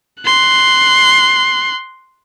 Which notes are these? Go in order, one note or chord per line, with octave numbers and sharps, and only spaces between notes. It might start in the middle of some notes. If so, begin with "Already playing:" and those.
C6 F#6